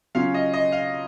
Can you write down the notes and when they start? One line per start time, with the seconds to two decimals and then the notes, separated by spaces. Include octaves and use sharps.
0.15 C#3 F#3 C#4 F4 F5
0.34 D#5
0.54 D#5
0.72 F5